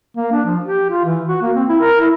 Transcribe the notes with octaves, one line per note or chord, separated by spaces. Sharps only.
A#3
D4
F3
G4
F4
E3
F#4
A#3
C4
E4
A#4
E4